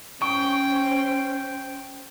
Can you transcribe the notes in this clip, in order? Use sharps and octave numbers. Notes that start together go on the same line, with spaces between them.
C#4 C5 G5 C#6